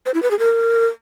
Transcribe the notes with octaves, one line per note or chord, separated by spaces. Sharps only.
C5
E4
B4
G#4
A#4